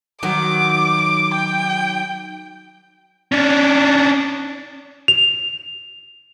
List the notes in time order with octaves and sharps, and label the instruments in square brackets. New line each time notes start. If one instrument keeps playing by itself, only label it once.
[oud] D#3 F#3 [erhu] D6
[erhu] G5
[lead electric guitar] C#4 D4
[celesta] F7